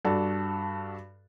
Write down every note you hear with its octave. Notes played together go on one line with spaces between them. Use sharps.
G2 F#4 A4 D5